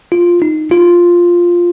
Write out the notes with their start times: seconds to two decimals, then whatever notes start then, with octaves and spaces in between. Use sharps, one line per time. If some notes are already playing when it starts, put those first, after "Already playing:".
0.12 F4
0.42 D#4
0.71 F4